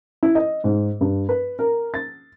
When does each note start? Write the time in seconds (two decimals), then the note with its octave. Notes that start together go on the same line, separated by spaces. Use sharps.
0.23 E4
0.35 D#5
0.64 G#2
1.01 G2
1.29 B4
1.59 A#4
1.94 A6